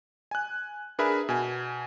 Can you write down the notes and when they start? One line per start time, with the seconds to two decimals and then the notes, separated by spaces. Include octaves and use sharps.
0.31 G#5 F#6
0.99 D4 G#4 A#4 B4 E5 B5
1.29 B2 G#5